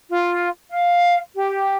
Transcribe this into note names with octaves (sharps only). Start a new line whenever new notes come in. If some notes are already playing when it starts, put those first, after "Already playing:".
F4
F5
G4